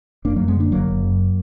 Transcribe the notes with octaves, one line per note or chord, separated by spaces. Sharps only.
F#1 A#3 D4
F#2 F#3 A#3
G#3 B3
D3 A#3 D4
F#1 F#3 A#3
F#1
F#2